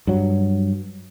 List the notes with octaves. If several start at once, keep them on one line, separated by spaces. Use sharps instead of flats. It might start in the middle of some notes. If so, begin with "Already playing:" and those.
G2 F#3